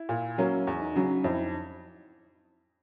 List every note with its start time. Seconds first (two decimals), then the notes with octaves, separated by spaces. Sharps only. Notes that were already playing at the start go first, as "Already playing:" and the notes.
Already playing: E4
0.09 A#2
0.38 F#3 A#3 C#4
0.67 E2 E4
0.80 D#4
0.92 C#3 F#3 D4
1.05 D#4
1.24 F2 E4
1.39 D#4